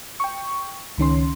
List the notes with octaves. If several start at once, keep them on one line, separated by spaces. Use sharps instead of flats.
G5 C#6
C#2 D#3 C#4 C6